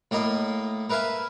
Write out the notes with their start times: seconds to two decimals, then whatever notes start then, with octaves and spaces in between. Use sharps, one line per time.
0.11 A2 A#3 A#4 D#5
0.90 A#4 B4 E5 F5 G#5